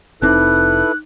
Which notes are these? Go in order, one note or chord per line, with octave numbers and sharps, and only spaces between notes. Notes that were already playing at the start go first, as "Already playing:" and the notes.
F1 C4 D#4 E4 A4 B4 D6 F#6